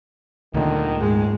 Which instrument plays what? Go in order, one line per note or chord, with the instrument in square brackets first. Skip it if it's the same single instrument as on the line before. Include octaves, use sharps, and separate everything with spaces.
[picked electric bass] D2 A#2 [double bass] D3 [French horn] D#3
[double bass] G#2 G#3